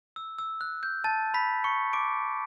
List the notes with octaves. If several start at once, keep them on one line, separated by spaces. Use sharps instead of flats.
E6
E6
F#6
G6
A5 A6
B5 B6
C#6 C#7
D6 D7